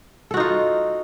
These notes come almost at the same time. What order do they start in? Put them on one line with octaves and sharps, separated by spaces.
A4 F#4 D#4 F4